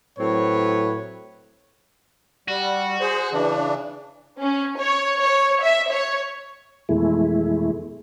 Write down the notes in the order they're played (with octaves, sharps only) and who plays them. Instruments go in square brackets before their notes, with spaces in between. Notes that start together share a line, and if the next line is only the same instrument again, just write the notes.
[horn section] A2 F#3 C4 B4 C#5
[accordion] G3 [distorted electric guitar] F#4
[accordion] G#4 C5
C#3 E3 D4
[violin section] C#4
C#5
C#5
E5
C#5
[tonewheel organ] F2 B2 E3 G#3 A3 E4